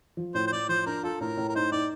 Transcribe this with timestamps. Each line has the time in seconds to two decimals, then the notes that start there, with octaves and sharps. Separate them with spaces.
0.17 F3
0.34 A2 C5
0.47 C5
0.52 A2 D5
0.69 F3 C5
0.86 D4 A#4
1.03 F4 A4
1.21 A2 A#4
1.37 A2
1.49 A#4
1.55 D#4 C5
1.71 D#4 D5